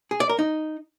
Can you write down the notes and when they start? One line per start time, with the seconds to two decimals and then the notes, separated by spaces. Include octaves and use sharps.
0.11 G#4
0.20 D5
0.29 A#4
0.39 D#4